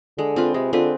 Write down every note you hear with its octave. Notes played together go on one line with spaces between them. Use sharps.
D3 G#3
C4 F4 B4
C3 G#3
D3 C4 F4 B4